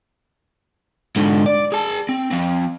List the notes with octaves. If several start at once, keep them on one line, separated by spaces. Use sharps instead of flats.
G#2 D3
D5
G#4 A5
C4
F3 C4